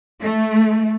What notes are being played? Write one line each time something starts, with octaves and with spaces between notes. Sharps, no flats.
A3